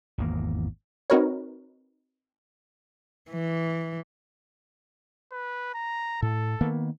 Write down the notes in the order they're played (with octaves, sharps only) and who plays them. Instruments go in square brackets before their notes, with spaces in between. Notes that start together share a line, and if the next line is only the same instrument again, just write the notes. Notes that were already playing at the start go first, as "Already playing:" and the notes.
[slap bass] G#1 E2 A#3
[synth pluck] C4 D#4 F#4 A#4 B4 C#5
[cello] E3
[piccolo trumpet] B4
A#5
[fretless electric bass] A2 [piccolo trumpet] A4
[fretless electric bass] D#3 A#3 B3